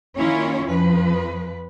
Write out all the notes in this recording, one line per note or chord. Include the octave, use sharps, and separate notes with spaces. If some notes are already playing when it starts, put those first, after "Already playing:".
D#3 A#3 C#4 E4 F4 C#5
F2 F3 B4